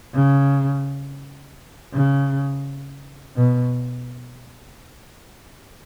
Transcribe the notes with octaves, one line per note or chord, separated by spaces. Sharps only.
C#3
C#3
B2